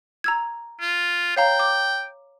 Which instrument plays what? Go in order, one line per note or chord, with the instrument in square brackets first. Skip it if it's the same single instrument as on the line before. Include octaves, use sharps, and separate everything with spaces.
[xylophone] A#5 E6 G#6
[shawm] F4
[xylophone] C#5 F5 A#5 [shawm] G5
[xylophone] D6